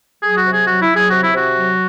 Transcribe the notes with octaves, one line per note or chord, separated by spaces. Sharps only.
F#3 G#4
F#4
C3
G#4
F#3 F#4
E4
F#3
G#4
C3 F#4
E4
C3 F#4
F#3